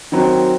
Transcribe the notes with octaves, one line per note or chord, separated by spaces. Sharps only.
D#3 F#3 C4